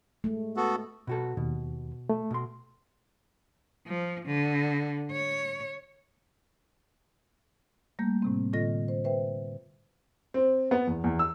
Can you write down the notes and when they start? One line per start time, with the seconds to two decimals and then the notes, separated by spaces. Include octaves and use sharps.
0.24 G#3 A3
0.56 B3 F#4 A4
1.07 B2 F#4 A4
1.37 D#2 B2
2.09 A3
2.31 B2 C6
3.87 F3
4.26 D3
5.11 C#5
7.99 G3 A3 A#3 G6
8.22 A2 C3 C4
8.53 A2 D3 F4 A4 D#5 A#6
8.88 C5
9.04 B4 C5 E5 G5
10.34 C4
10.71 B3
10.87 E2
11.04 E2
11.19 E6